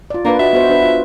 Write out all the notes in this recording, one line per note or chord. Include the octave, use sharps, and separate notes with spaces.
F4 D5
A#3 D4 B4
F#4 D#5 E5
B3 F#4 C5
D4 F#4 B4
F4